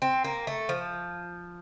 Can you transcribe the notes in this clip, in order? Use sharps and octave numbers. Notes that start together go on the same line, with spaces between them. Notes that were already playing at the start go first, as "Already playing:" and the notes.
C4
A#3
A3
F3